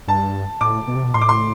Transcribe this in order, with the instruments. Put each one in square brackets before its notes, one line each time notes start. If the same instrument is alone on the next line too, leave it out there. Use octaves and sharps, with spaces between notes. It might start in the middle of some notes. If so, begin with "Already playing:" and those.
[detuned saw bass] G2 [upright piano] A5
[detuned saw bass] A2 [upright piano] D6
[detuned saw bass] B2
C3
B2
[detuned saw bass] A2 [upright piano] C6
[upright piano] D6
C6